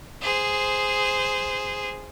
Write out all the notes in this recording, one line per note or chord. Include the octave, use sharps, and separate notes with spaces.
G#4 C5